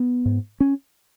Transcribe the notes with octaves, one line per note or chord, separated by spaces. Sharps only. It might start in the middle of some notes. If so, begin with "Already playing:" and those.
Already playing: B3
G#2
C#4